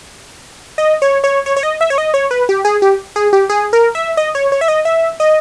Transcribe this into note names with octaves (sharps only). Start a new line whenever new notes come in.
D#5
C#5
C#5
C#5
C#5
D#5
E5
C#5
D#5
C#5
B4
G4
G#4
G4
G#4
G4
G#4
A#4
E5
D#5
C#5
C#5
E5
D#5
E5
D#5